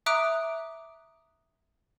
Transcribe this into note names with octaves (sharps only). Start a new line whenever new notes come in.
E5 A#5 D6 D#6 F#6 D7